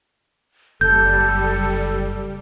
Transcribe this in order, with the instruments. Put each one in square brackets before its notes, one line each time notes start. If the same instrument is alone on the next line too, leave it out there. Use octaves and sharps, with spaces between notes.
[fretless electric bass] F#1 [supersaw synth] G3 [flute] A4 [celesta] G6